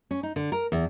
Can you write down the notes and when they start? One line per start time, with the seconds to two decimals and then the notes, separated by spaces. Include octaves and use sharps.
0.11 C#4
0.23 D#4
0.36 D3
0.52 A#4
0.72 E2